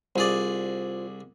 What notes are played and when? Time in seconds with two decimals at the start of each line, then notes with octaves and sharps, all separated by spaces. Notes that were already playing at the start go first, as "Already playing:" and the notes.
0.16 C2 F4 G#4 C5 D5